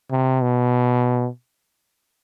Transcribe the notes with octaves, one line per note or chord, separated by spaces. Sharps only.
C3
B2